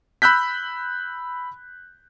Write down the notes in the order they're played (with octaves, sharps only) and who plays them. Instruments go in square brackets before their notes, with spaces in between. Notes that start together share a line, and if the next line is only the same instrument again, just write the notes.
[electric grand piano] B5 E6 F#6 G6 B6